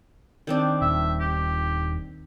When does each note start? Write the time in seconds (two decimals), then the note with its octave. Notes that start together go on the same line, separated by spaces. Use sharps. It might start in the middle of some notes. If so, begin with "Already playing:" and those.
0.47 D#3 C4 D4
0.82 D#1 E5
1.20 G4